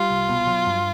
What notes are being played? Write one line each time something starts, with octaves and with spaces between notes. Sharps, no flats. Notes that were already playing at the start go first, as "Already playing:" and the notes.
Already playing: G3 F4
C2
B2
F#3
G2